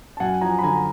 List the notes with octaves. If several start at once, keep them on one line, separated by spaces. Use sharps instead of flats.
A5
F#2 F#5 G#5
F3 G#5 A#5
B5
D3 G#5 A#5